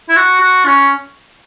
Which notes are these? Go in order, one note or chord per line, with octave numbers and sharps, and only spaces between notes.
E4
F#4
F#4
C#4